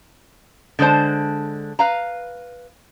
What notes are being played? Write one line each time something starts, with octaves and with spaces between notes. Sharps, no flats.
D3 G#3 D4 C5 A5
B4 F5 A#5